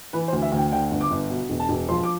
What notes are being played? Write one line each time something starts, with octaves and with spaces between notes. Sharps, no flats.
E3 B4
C5
D2
E5
D2
G5
D3 G5
G1
D6
G1
B2
E1
A5
E1
F3 C6
D6